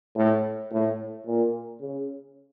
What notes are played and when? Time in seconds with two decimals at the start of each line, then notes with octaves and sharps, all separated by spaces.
0.16 A2
0.72 A2
1.26 A#2
1.81 C#3